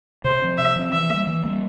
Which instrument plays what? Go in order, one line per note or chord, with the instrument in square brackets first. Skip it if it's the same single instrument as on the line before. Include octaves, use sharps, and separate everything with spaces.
[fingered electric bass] C3 [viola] C5
[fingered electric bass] F3 C4
[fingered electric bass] C3 [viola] E5
[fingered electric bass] F3 C4
[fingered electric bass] E3 [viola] E5
[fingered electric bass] G3 A#3
E3
G3 A#3